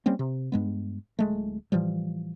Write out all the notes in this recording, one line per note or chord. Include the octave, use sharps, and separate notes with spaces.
G3 A#3 C4 C#4
C3
G2 G#3 B3
D1 G#3 A3
A2 E3 F3 G3